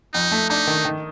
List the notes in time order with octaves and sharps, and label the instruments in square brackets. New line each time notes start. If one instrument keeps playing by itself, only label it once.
[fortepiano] F2 [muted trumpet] D#4
[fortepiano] A3
[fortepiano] D4 [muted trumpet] D#4
[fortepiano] D#3
D#3